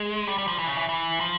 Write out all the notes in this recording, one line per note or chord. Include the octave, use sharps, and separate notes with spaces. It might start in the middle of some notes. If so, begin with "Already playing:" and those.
Already playing: G#3
G3
G3
F3
E3
C#3
E3
E3
F3